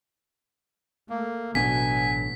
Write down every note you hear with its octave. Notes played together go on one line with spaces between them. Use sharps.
A3 A#3
A1 B2 F#3 B3 D4 G#5 B6